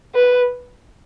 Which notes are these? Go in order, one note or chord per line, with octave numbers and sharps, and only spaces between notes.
B4